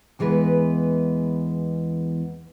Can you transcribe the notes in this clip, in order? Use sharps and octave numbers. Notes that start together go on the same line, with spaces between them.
E2 E3 G#3 B3 B4